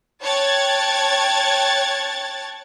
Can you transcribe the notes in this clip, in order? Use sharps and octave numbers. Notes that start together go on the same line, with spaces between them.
C#5 G5 A5 F#6 G#6 A6